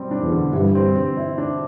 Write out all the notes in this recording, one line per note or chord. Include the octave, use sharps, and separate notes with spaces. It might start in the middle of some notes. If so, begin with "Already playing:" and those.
Already playing: G3 C4
D4
E2
D3
G2 E3
C4
C4
E4
D4